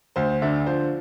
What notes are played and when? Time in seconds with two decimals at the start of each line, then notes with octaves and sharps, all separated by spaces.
0.16 D2 C5
0.42 D3 E5
0.66 F3 C5